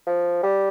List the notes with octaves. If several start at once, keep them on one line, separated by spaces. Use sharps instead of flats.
F3
G3